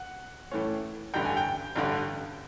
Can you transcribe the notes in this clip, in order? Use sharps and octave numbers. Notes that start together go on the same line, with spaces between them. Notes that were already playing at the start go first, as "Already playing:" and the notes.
Already playing: F#5
A2 E3 A3 C#4
A1 G2 D3 G5
G#5
G5
A1 G2 D3